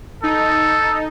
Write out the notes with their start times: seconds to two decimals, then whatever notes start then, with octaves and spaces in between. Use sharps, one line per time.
0.23 D#4 A4